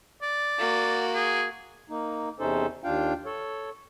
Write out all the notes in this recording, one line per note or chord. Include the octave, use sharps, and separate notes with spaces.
D5
A#3 F#4
G#4
A#3 D#4
E2 C3 C#4 D#4 A4 C5
D#2 D4 F4 F5 G5
A4 C#5